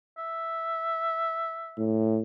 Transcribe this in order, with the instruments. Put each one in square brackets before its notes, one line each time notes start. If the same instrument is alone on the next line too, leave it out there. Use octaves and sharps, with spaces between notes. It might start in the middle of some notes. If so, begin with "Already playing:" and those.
[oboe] E5
[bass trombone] A2